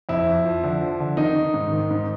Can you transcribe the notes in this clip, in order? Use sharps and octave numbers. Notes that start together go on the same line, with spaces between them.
F2 E4
F2
F3
D3
F3
D3
D#3 D#4
D#3
G#2
D#3
G#2